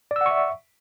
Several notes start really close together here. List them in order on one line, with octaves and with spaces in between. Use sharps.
D5 E6 F#5 C#6 E5